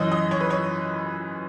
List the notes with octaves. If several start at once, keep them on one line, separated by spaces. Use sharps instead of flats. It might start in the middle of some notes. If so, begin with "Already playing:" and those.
Already playing: F#2 E3 C#5 D#5
D#5
C#5
B4
C#5